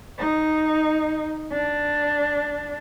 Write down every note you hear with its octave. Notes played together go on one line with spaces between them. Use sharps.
D#4
D4